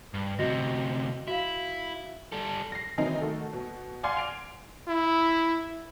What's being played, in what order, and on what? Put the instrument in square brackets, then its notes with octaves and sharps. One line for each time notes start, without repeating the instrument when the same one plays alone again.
[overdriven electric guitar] G2
[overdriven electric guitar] D2 C3 [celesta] F#4 D#5 A#6
[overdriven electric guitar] E4 [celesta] F#4 F5
[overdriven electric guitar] G3 A4
[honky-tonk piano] A#6 C7
D#3 E3 F#3 C4 D#4
D#3 A3 F#4 A4
B2
D5 F5 F#5 G#5 C6 D6
C7 D7 F7
[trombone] E4